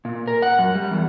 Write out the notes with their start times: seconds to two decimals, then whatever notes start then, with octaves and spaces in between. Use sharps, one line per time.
0.05 A#2
0.27 A#4
0.42 F#5
0.59 F#2
0.75 G3
0.91 E2